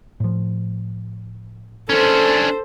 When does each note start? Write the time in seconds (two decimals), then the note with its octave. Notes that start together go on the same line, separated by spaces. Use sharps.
0.20 A2 F3
1.90 C#4 D4 A4 C5